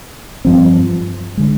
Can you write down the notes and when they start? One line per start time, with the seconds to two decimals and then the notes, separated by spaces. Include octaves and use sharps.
0.45 G2 F3 C4
1.37 D3 G#3